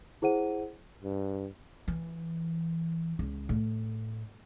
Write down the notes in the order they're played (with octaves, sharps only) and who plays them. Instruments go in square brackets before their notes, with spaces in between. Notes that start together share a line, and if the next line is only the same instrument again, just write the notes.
[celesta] E4 G#4 C5 F#5 D#7
[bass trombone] G2
[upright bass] E3
C#2
A2